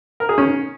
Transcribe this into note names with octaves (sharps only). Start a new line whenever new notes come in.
A#4
G#4
C#4